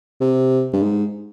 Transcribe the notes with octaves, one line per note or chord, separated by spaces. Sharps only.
C3
G2
G#2